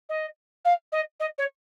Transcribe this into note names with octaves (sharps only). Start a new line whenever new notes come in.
D#5
F5
D#5
D#5
C#5